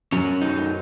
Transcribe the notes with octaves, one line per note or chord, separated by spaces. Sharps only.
F#2 D#3 F#3 C#4
D#4